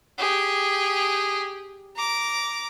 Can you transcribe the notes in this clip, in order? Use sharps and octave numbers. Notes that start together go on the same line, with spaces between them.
G4 G#4
A#5 D6